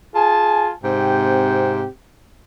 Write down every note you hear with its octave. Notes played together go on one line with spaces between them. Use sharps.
F4 G#4 G#5 A5
G#2 C3 C4 G4 G5